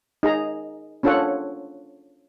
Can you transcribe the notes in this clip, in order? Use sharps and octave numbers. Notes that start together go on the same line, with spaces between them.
D#4 G#4 A#5
C#4 D4 F4 A4 C#5 F#5